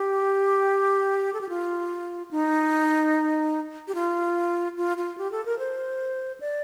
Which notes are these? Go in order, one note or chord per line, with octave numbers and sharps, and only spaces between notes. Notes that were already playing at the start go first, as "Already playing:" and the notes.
Already playing: G4
A4
G4
F4
D#4
G4
F4
F4
F4
G4
A4
A#4
C5
D5